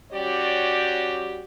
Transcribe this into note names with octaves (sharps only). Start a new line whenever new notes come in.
G3 C#4 F#4 G4 C#5 D5